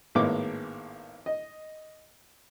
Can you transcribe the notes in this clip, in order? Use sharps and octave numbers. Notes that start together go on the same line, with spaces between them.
G#1 A2 G#3 A#3 B3 D6
D#5